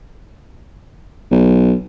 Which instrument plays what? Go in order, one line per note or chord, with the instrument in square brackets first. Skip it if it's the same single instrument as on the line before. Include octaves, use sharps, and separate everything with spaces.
[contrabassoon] B1